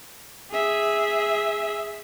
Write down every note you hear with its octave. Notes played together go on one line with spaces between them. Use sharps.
G#4 E5